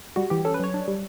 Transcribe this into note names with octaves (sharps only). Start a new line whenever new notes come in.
G3 F#4
E3 G4
C#4 A4
B4
F#3 C#5
D4
G3